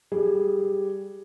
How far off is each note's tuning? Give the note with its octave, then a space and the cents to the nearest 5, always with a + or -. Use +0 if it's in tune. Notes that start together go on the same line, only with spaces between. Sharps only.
G3 +0 G#4 +0